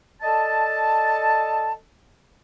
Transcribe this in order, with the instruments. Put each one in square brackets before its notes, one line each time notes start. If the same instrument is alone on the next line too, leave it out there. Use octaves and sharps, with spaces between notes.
[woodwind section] A4 D5 D#5 A5